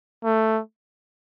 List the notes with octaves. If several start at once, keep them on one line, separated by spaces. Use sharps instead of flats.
A3